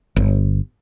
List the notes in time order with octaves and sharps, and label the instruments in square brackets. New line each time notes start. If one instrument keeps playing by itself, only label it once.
[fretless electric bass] G1